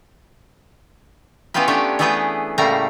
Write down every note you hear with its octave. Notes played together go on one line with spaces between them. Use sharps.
E3 B3 C#4 F4 G4 B4
A3 B3 C#4 D4 G4 C#5
E3 A3 B3 G#4 B4 G5
A2 C#3 G3 A3 A#3 A#5